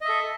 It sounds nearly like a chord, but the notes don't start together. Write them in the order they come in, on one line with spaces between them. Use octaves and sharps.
D#5 E5 A4